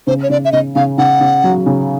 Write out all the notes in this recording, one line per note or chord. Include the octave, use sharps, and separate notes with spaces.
C#3 C5
C#5
C#3 D5
E5
C#3 D#5
C#3 F5
C#3 F#5
C#3
F#3
C#3